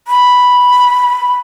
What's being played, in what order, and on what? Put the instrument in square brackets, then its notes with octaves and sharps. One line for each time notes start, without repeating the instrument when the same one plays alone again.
[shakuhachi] B5